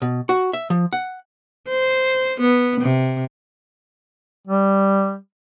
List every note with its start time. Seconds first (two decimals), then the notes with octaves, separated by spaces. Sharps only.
0.02 B2
0.29 F#4
0.53 E5
0.70 F3
0.93 F#5
1.68 C5
2.40 B3
2.81 C3
4.47 G3